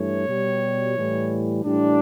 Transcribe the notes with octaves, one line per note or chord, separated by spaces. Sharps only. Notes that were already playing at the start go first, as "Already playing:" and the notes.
Already playing: G2 E3 A3 C#5
B2 G3
A2 E3 G3
A2 E3 G3 D4